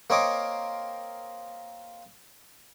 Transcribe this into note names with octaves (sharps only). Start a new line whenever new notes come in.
A#3 C4 C#5 D#5 D6